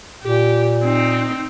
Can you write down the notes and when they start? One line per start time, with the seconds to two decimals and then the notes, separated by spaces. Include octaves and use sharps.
0.23 A#2 G4
0.83 C4 D#4